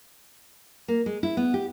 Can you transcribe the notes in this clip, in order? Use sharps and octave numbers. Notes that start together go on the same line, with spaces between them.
A#3
G#3
E4
B3
G4